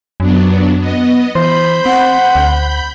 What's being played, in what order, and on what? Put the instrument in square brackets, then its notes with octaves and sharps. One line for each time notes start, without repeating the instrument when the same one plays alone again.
[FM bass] F#2 [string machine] F#3 B3 D4
[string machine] B3 D#5
[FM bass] E3 [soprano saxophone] C5 [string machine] B5 G6
[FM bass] C4 [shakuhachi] F#5
[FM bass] D2